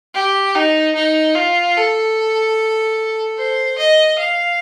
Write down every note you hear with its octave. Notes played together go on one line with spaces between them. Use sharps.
G4
D#4
D#4
F4
A4
C5
D#5
F5